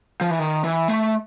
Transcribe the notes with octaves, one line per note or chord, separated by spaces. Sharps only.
F3
E3
D#3
E3
A3